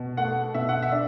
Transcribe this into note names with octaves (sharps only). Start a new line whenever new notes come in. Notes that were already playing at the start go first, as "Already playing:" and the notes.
Already playing: B2
A3 F#5
B2 E5
F#5
E5
D4